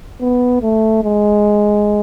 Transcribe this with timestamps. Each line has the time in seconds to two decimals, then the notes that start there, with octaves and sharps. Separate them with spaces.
0.21 B3
0.62 A3
1.04 G#3